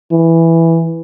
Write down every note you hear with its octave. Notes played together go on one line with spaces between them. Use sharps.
E3